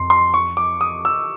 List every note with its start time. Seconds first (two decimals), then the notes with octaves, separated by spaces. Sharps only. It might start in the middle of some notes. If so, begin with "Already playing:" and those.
Already playing: F2 C6
0.10 C6
0.34 C#6
0.57 D6
0.81 D#6
1.05 E6